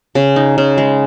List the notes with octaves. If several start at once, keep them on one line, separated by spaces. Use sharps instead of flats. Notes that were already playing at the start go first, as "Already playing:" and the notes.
C#3
D#4
C#3
G#3